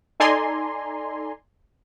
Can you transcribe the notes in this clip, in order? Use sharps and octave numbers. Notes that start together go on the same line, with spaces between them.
D#4 A4 D5 G#5 A#5 C6